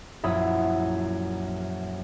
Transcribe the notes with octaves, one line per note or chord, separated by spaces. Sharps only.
A#1 F#2 E4 E5 B5 D#6